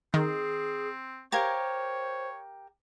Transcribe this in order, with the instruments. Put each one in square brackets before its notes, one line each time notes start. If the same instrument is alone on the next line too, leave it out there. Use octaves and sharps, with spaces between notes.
[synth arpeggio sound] D#3 [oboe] C4 [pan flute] G#4
[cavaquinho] G4 A#4 F5 [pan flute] C5 [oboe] C#5 [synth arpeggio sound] G#6